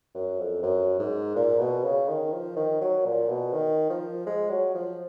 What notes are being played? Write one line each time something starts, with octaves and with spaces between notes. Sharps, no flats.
F#2
F2
F#2
G#2
A#2
B2
C#3
D#3
F3
D#3
F#3
A#2
B2
D#3
F3
G#3
F#3
F3